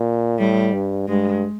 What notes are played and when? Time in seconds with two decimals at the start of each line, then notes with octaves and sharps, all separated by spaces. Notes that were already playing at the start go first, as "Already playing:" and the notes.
Already playing: A#2
0.39 A2 G3
0.74 G2
1.08 G2 G#3